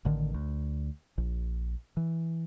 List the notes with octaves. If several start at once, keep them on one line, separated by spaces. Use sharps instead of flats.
A1 D3 D#3
D2
A#1
E3